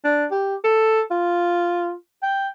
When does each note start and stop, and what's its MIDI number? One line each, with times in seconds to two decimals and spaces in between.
0.05 0.26 62
0.31 0.56 67
0.64 1.01 69
1.11 1.93 65
2.23 2.48 79